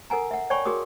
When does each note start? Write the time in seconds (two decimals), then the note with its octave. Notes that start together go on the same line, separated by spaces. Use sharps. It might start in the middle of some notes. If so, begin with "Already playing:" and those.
0.10 A4 A#4 F#5 G#5 A#5
0.31 E5 F#5
0.50 C#5 D5 G5 G#5 B5 C#6
0.65 F#4 G#4 A#4 D#6